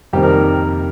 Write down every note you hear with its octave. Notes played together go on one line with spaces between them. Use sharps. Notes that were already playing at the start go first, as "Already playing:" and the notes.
F2 C3 D#3 G3 A#3 G4
A#4